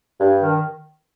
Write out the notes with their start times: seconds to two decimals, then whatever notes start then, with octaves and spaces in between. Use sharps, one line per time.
0.19 G2
0.41 D#3